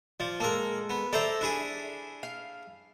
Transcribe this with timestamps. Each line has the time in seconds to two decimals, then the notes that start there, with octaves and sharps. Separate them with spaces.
0.20 F3 D5
0.40 G#3 A#3 A4 A#4 A5
0.90 B3
1.13 A4 C5 D5 E5 A#5
1.41 D4 E4 G#4
2.23 F5